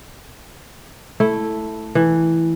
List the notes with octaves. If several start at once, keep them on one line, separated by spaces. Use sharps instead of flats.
A3 E4
E3